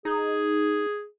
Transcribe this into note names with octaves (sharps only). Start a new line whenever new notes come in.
D#4 G#4